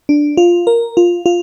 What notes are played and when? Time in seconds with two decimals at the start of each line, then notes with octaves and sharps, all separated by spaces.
0.09 D4
0.37 F4
0.67 A#4
0.97 F4
1.26 F4